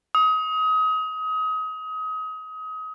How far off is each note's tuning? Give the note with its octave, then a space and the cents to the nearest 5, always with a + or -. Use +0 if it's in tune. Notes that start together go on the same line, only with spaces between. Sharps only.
D#6 +30